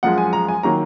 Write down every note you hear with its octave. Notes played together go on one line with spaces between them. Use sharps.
F#2 F3 G#3 F#5
G#5
A#5
G#5
D#3 F#3 A#3 A#5